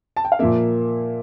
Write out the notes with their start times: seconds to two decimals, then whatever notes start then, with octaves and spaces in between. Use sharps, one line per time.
0.17 A5
0.25 G5
0.32 F5
0.39 A#2 F3 A#3 E5